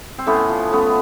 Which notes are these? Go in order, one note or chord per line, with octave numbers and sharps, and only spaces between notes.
C4
A2 B3 C#4
F3
A2 B3 C#4